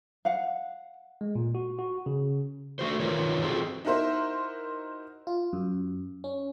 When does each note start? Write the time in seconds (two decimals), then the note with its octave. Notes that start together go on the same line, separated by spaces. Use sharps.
0.25 F5 F#5
1.21 G#3
1.35 A#2
1.55 F#4
1.79 F#4
2.06 C#3
2.79 A3 F#4 C5
3.00 D#3 F4 A#4 B4 C#5
3.43 C4 F4 F#4 G#4 A4 C5
3.85 D#4 E4 F#4 A#4 C5 E5
5.27 F4
5.53 F#2
6.24 C#4